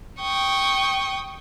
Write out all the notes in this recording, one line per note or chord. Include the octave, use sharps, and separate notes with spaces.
G5 C#6 D#6